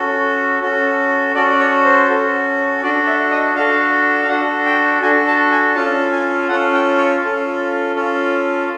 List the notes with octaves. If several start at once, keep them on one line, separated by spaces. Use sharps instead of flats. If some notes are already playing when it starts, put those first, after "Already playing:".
Already playing: C#4 F#4 A4
C#4 F#4 A4
C#4 F#4 A4 D5
D5
C#5
C5
C#4 F#4 A4
D4 F#4 A4 D5
E5
D#5
D4 F#4 A4 F5
F5
D4 F#4 A4 F#5
G5
D4 F#4 A4 G#5
A5
G#5
C#4 F4 A4 A5
G#5
C#4 F4 A4 F#5
G5
C#5
C#4 F4 A4
C#4 F4 A4